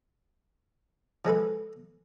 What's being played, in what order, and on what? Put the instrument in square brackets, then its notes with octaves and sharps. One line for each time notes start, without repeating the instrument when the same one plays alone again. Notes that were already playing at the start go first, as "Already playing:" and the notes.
[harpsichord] F3 G#3 A4 B4